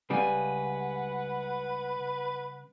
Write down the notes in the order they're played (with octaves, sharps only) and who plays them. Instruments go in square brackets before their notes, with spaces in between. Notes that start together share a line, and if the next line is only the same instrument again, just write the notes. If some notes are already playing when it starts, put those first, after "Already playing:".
[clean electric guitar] C#2 G#5 [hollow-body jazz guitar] C#3 G3 [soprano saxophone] B4 [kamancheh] F#5